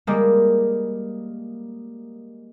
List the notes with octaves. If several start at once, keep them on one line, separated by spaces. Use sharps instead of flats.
G3 G#3 A#3